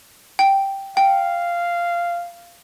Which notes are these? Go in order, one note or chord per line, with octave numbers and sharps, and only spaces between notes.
G5
F5 G5